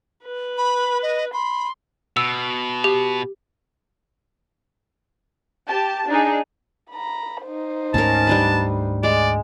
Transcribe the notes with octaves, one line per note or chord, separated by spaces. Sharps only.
B4
B5
D#5
B5 C6
B2 E6
G4
G4 A5
D4 D#4 G#4
A#5 B5
D#4 C5
D2 G#2 A3 C#4 A#4 A5
G3 D4 B4
G#3 D5